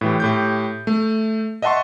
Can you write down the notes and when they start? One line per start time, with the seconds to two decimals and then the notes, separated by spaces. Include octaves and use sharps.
0.01 A2 E3 G4
0.20 A2 G4 G6
0.87 A3
1.62 D#5 E5 F#5 A5 C6 C#6